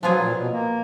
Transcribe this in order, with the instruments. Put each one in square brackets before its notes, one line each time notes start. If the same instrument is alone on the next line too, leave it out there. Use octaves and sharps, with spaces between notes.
[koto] F3 B3 F4 G#4 [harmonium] F#3
[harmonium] A#2
B2
A#3